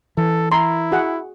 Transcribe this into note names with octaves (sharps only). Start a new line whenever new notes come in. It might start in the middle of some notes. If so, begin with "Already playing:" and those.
E3 A4
E4 A#4 C6
F#4 G#4 F#5